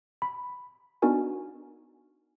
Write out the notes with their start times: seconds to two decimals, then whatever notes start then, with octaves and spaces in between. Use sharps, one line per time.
0.22 B5
1.02 B3 D4 D#4 F#4 A#4 G#5